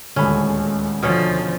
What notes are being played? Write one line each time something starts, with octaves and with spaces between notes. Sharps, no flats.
D#1 D2 G#3 C#4 B5
B2 D3 F3 C#4